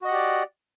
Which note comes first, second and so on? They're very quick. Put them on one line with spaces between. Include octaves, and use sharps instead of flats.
F#4 D#5 F#5 G4 D5